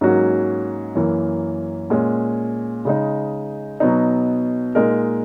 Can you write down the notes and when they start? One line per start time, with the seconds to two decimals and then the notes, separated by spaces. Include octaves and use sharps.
0.01 G#2 F#3 A#3 C#4 F#4
0.95 F#2 E3 A#3
1.90 A#2 G#3 C#4
2.85 C#3 G#3 D#4
3.80 B2 F#3 B3 D#4
4.75 A#2 G#3 D#4 A#4